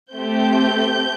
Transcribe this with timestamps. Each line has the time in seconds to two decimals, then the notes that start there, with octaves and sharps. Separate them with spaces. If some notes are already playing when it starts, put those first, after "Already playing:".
0.15 A3 C4 G4 G6